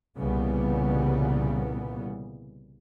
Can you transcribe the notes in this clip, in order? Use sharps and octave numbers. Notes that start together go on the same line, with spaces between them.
C2 A#2 C#3 E3 G3 B3